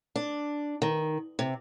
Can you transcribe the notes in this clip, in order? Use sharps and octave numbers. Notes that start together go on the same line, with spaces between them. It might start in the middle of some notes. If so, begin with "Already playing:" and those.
D4
D#3
C3